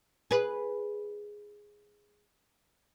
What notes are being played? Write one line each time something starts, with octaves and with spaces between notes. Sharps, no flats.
G#4 B4